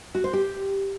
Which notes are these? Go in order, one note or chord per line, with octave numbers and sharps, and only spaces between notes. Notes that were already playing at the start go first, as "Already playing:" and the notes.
F#4
C5
G4